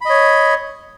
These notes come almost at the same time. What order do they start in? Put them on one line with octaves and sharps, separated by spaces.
B5 D#5 C#5